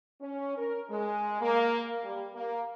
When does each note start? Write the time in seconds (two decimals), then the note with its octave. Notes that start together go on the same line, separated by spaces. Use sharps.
0.21 C#4
0.57 A#4
0.90 G#3
1.41 A#3
2.04 G3
2.34 A#3